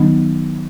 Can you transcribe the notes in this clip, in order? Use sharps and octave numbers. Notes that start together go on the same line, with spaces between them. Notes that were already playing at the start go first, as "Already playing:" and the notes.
Already playing: D#3 F#3 B3 D#4